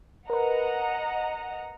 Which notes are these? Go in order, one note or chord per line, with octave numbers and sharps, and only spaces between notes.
A#4 B4 D#5 F#5 A#5